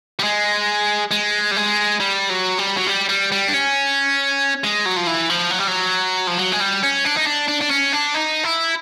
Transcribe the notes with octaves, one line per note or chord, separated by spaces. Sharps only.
G3
G#3
G#3
G3
G#3
G3
F#3
G3
F#3
G3
G3
G3
D4
C#4
G#3
F#3
F3
E3
F3
F#3
G3
F#3
F3
F#3
G#3
G3
C#4
D4
D#4
D4
D4
D4
C#4
D4
D#4
E4